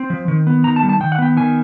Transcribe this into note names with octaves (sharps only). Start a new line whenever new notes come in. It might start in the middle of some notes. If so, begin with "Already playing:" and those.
Already playing: C4
F3
D#3
B3
D#3 A#5
A5
G3
A5
D#3 G5
F#5
B3 G5
D#3 G#5